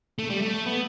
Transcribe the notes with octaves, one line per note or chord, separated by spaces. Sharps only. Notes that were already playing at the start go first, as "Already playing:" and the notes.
A3
G3
A3
B3